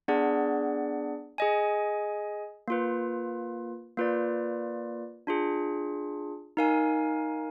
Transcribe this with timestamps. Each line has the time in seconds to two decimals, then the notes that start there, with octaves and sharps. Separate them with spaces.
0.08 B3 D4 G#4 D5 F#5
1.38 G#4 D#5 G#5
2.68 A#3 F4 B4
3.97 A#3 F4 B4 D5
5.27 D4 F4 G#4
6.57 D#4 A#4 F5 G#5